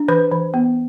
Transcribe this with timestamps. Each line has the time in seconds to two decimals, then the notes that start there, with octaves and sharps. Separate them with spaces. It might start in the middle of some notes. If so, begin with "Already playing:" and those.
Already playing: D4
0.08 E3 B4
0.31 E3
0.54 B3